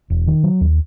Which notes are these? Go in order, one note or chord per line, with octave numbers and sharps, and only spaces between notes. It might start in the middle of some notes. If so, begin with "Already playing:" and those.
E1
D#3
F#3
D#2